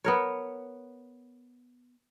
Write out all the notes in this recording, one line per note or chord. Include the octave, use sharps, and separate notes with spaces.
B3 A#4 C#5